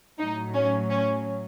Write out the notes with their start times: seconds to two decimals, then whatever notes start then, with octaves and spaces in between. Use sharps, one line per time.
0.19 A2 F#3 D#4
0.54 C#4
0.90 C#4